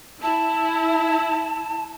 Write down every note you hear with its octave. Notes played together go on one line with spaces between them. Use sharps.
E4 A5